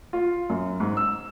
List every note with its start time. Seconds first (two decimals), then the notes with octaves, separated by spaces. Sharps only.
0.13 F4
0.50 F#2
0.80 G#2
0.97 E6